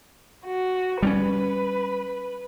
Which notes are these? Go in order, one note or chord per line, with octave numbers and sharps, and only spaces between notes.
F#4
G3 B3 C#4 B4